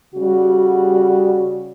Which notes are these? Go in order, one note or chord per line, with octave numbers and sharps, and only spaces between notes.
C#3 G3 F#4